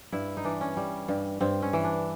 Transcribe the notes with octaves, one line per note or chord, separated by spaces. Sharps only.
G2 E4
D#4
E3 D4
C#4
G3
G2
G2 C4
C#4
E3
D4